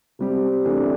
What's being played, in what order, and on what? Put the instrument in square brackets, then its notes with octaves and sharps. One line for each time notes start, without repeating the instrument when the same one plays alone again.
[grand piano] C3 G3 C4 G4
C3 E3 A3 D4